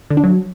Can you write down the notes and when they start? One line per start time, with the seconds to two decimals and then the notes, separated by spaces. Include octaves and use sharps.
0.10 D3
0.17 D4
0.24 F#3